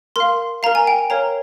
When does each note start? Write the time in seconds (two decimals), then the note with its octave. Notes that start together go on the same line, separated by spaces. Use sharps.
0.16 A#4 F5 C6
0.63 A#4 F5 A#5
0.75 G#5
0.87 G5
0.99 G#5
1.10 A#4 C#5 F5 A#5